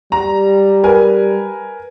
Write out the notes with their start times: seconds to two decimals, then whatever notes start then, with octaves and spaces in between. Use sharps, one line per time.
0.12 G3 A#5
0.83 A#4 B4 G#5